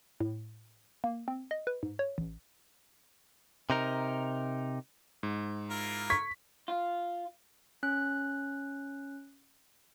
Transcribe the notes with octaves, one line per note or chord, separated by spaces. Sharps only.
A2
A#3
C4
D#5
B4
G#2
C#5
A1
C3 D#4 A#4
G#2
E4 F4 A#4
C#6 G#6 B6
F4
C#4 F#6